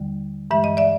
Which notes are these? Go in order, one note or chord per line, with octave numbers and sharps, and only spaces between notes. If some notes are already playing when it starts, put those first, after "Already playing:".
Already playing: D#2 D3 G3
G2 E3 G#3 E5
D#5
D5 E5